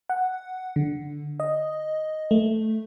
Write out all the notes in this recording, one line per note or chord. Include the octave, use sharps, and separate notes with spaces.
F#5
D3
D#5
A3